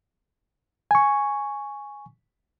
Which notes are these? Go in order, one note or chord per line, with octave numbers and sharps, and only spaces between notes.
G#5 C#6